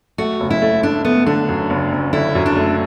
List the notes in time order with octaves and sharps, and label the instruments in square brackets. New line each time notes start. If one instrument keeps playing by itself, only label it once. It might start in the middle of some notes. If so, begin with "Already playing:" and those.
[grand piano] A3 [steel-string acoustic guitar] F#4
[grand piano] F#1
[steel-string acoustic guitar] E4
[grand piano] A3
[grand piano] A3 [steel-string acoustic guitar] D4
[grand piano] A3 [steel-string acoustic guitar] B3
[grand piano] D3 [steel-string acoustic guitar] D4
[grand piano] F#2
F#1
F#1
[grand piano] D3 [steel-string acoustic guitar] E4
[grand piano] F#2
[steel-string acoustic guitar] D4
[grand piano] A3